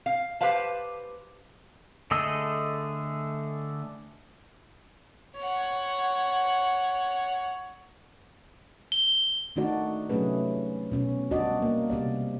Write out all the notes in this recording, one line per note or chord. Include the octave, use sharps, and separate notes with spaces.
F5
G4 B4 C5 F5 A5
D3 A3 G#4 D#5 E6
C#5 F#5
G7
D#3 A3 D4 D#4 F#4 D5
C3 F#3 A3 C#4 G#4 B4
B2 C#4
G3 B3 D4 F#4 D5 D#5
A#3
C3 G3 D5